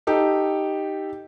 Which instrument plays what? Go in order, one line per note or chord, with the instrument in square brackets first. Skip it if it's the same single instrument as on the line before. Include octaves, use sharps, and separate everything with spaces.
[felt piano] D#4 G4 A4